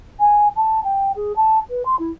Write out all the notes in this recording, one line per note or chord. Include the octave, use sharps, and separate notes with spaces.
G#5
A5
G5
G#4
A5
B4
C6
E4